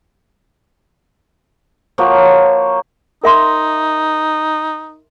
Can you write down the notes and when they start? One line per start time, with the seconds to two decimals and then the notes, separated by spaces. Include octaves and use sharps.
1.98 F3 A#3 F#4 C#5
3.24 D#4 A#4 E5 C6